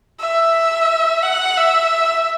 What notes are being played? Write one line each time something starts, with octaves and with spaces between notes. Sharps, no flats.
E5
F#5
E5